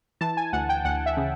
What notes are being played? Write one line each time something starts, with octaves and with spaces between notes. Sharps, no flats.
E3 A5
G#5
D2 F#5
G5
D2 F#5
E5
C#3